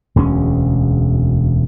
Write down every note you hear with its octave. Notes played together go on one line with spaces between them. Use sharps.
E1 D2 G#3 C#4